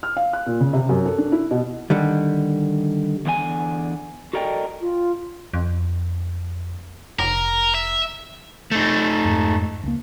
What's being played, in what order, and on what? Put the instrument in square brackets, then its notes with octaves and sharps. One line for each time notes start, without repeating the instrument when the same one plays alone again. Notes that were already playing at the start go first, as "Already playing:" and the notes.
[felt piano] F6
F5
F#6
A#2
C#3
C3
F#2
A4
D4
E4
B2
[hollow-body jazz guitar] D3 D#3 G3
[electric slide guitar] E2 D3 D4 G#5
F#4 A4 A#4 D5 D#5 G5
[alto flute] F4
[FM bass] F2
[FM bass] F1 [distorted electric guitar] A#4
[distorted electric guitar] E5
[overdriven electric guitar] A3 D#4
[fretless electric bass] F2 G#2
C#2 A#3